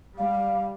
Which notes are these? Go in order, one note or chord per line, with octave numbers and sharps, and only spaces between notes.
G3 F5